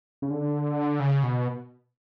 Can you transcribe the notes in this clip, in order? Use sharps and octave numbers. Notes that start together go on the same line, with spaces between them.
C#3
D3
C#3
B2